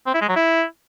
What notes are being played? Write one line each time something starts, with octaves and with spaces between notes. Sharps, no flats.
C4
E4
G#3
F#3
E4